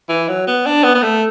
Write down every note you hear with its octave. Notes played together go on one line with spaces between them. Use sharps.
E3
F#3
B3
D4
B3
B3
A3